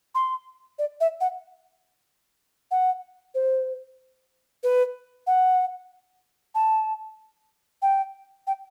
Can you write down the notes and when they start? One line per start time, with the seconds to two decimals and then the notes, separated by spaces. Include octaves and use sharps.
0.15 C6
0.79 D5
1.01 E5
1.21 F#5
2.71 F#5
3.35 C5
4.63 B4
5.27 F#5
6.55 A5
7.82 G5
8.47 G5